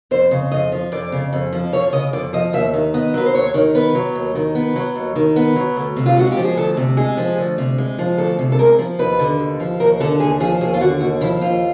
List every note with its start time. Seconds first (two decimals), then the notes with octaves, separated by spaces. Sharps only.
0.11 F2 C5
0.31 C#3
0.52 F2 D#5
0.72 F3
0.92 F2 D5
1.12 C#3
1.33 F2
1.53 F3
1.73 F2 C#5
1.93 C#3 D#5
2.13 F2 D5
2.33 F3 D#5
2.53 D#2 E5
2.74 D#3
2.94 B3 D#5
3.14 F#3 B4
3.26 C5
3.34 D#2 C#5
3.54 D#3
3.75 B3 B4
3.95 F#3
4.15 D#2
4.35 D#3
4.55 B3
4.76 F#3
4.96 D#2
5.16 D#3
5.36 B3
5.56 F#3
5.76 D2
5.97 C3
6.06 F4
6.16 G#3 F#4
6.32 G4
6.37 F3
6.44 G#4
6.57 D2 A4
6.77 C3
6.97 G#3 G#4
7.17 F3
7.38 D2
7.58 C3
7.78 G#3
7.98 F3
8.18 D2 A4
8.39 C3
8.52 A4
8.59 G#3 A#4
8.79 F3
8.99 D#2 B4
9.19 D3
9.40 D#2
9.60 F3
9.80 D#2 A#4
10.00 D3 A4
10.20 D#2 G#4
10.40 F3 G#4
10.61 D#2 G#4
10.74 F4
10.81 D3 F#4
11.01 D#2 F#4
11.21 F3 E4
11.41 D#2 F4